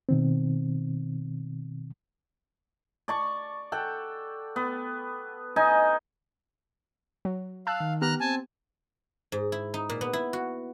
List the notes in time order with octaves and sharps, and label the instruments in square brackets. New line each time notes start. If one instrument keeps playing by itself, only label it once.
[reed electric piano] B2 D#3 C4
[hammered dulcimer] D5 A5 C#6
A4 F#5 G5
B3
D#4 D#5 G#5
[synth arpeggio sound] F#3
[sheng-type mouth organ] F5 [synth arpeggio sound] A5 E6 F#6 [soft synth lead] C7
[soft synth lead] D#3
[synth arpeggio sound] B3 G4 [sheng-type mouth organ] A#5 F6 F#6
[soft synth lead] C4 [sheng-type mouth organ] G#5 A5
[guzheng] G#2
E4
D#4
A#2
B3
E4
F#4